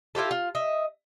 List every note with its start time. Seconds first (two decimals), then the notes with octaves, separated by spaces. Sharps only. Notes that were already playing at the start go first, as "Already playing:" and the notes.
0.15 E4 F4 G4 A4
0.31 F4
0.55 D#5 E5